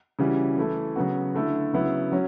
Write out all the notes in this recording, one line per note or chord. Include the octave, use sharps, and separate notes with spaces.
C#3 E3 G3 C#4 F#4
E3 A3 E4 A4
C#3 F#3 B3 F#4
D3 A3 E4 A4
C#3 F#3 B3 E4
F#3 C#4